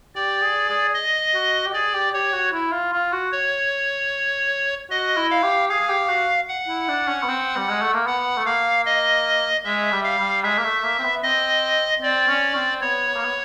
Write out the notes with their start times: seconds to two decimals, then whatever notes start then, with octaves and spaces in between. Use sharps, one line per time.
0.15 G4 D5
0.42 G#4
0.69 G#4
0.94 D#5
1.34 F#4
1.66 G4
1.73 G#4 D5
1.94 G4
2.13 G4 C#5
2.33 F#4
2.53 E4
2.72 F4
2.93 F4
3.12 F#4
3.32 C#5
4.91 F#4 D#5
5.16 E4
5.30 F5
5.43 G4
5.69 G#4 F5
5.80 G#4
5.89 G4
6.09 F#4
6.49 F#5
6.68 E4
6.88 D4
7.07 C#4
7.22 B3
7.28 C4
7.57 G3
7.69 G#3
7.81 A3
7.94 A#3
8.06 B3 F#5
8.37 A3
8.46 A#3 F5
8.86 D#5
9.65 G#3 E5
9.92 G3
10.04 F5
10.18 G3
10.44 G#3 E5
10.58 A#3
10.64 A3
10.83 A#3
10.99 C4
11.04 B3
11.23 C4 D#5
12.02 C4 D5
12.28 C#4
12.55 C4
12.81 B3 C#5
13.08 B3
13.16 A#3
13.25 B3